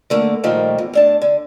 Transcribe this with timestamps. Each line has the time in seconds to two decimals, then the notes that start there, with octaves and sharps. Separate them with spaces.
0.10 D3 A3 A#3
0.43 A#2 D#3 F3 G3 A3 A#3
0.78 E2
0.93 A2 D4 A5
1.22 D3